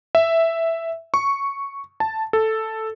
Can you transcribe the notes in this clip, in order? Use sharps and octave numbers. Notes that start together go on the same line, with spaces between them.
E5
C#6
A5
A4